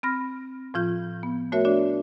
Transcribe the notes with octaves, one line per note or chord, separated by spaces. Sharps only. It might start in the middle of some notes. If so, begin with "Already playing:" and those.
C4 B5 F6 A#6
A2 F3 F4 G6
B3
A3 F#4 A#4 C#5 E5
D4 F#4 D5